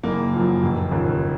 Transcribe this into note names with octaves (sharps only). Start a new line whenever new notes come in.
F#1 A#3
F#2 F3
F1
D#2 C#3 F3